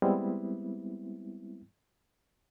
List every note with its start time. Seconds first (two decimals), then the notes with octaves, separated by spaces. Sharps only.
0.02 G3 G#3 B3 C4 E4